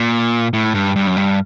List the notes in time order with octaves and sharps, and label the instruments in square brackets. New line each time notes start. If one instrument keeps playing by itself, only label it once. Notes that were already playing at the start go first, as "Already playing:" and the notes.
Already playing: [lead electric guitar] A#2
A2
G2
G2
F#2
G2